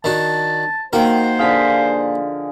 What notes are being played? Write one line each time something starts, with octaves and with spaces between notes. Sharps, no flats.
D#3 D4 F#4 A5
D#3 A#3 F#4 A#4 C5
D3 F3 G#4 F5 B6